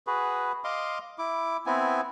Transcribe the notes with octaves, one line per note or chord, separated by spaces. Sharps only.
F#4 G#4 B4
D#5 F5 C6 D6
E4 D6
B3 C4 E4 G#5